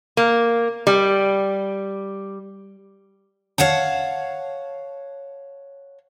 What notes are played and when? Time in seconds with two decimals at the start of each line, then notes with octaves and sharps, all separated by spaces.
0.17 A#3
0.87 G3
3.58 C#5 F5 F#5 A5